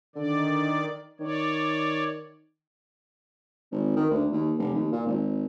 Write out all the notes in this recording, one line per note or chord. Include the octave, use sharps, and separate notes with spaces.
D3 D#3 D5
D#3 C#5 D5
G#1
D#3
D2
D#2
F1
D#2
A#2
G#1